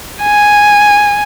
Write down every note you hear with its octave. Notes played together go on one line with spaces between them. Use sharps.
G#5